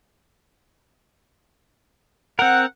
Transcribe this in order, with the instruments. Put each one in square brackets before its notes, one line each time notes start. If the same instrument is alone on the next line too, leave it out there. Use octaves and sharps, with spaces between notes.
[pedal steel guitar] C4 A#4 [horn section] F#5